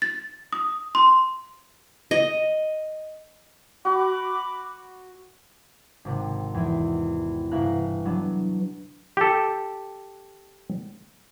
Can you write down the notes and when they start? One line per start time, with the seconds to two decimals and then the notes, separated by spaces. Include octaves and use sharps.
0.02 A6
0.53 D#6
0.95 C6
2.11 D#5
3.85 F#4 B5 D6
6.05 G#1 C3
6.54 E2 E4
7.51 G1 C3 E4 F5 A#5 F#6
8.05 F#3 B3 D4
9.17 G4 A4